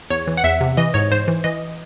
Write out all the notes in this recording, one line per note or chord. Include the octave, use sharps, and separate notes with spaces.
E2 C#5
E3
F#5
E2 E5
C3
E3 D#5
G#2 C#5
G#2 C5
E3
E3 D#5